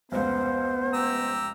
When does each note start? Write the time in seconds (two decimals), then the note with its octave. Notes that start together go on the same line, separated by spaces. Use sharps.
0.12 F1 C#2 B3 C5
0.94 G4 A#5 E6